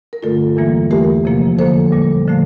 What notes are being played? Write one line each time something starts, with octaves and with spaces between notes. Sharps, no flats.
A#4
G2 D3 A3 F4 A4
E2 E3 G3 A#3
E2 E3 A3 G4 A#4
F2 C3 F3 A#3
F2 D3 F3 A#3 A4 C5
A#2 G3 A#3
D3 F3 A3